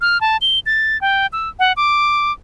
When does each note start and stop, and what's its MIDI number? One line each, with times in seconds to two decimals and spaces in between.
0.01 0.20 89
0.21 0.37 81
0.42 0.59 103
0.66 1.00 93
1.01 1.27 79
1.33 1.49 88
1.59 1.73 78
1.77 2.32 86